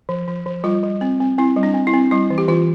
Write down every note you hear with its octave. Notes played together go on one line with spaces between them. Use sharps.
F3
F3
F3
G3 F4
G3
C4
C4
C4 E4
G3
D4
C4
E4
C4
G3 E4
E3
G4
E3 F4